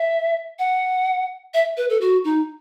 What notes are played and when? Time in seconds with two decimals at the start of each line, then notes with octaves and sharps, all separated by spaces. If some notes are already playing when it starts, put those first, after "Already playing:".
Already playing: E5
0.59 F#5
1.54 E5
1.77 B4
1.90 A4
2.01 F#4
2.24 D#4